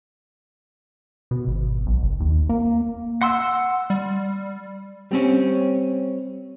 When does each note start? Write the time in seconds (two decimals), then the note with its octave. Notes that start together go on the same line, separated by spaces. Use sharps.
1.31 B2
1.48 G#1
1.86 B1
2.02 F#1
2.20 D#2
2.49 A#3
3.22 F#5 C6 E6
3.90 G3
5.11 G3 C4 C#4